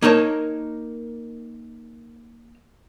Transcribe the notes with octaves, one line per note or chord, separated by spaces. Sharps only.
A#3 D#4 A#4 C#5 A5